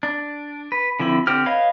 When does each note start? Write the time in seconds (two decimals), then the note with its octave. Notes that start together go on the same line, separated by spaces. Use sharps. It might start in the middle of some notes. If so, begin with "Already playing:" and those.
0.03 D4
0.72 B4
1.00 D3 F3 C4 E4
1.27 D3 C4 G4 F6
1.46 B4 C#5 D#5 F5 B5